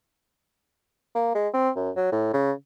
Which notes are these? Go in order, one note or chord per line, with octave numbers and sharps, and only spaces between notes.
A#3
G#3
C4
F#2
F#3
A2
C#3